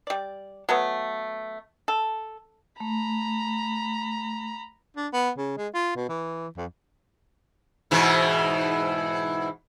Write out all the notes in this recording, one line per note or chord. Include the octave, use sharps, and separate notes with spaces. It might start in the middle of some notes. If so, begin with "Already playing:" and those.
G3 D5
F#3 A3 B3
A4
A3 A#5 B5
D4
B3
C#3
G#3
F4
B2
E3
F2
G#2 B2 E3